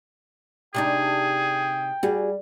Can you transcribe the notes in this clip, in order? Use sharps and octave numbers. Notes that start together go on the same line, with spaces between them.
C3 D4 D#4 G#4 G5
G3 F#4 G#4